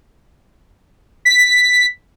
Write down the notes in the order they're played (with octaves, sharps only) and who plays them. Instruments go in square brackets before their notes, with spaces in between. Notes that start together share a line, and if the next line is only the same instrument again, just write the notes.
[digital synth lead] B6